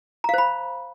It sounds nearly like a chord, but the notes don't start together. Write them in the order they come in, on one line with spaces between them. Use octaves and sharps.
A#5 F5 C5 B5